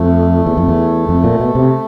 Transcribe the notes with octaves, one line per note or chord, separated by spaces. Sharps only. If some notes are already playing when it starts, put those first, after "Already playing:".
Already playing: F2 A3
E2
F2
E2
F2
A#2
B2
C3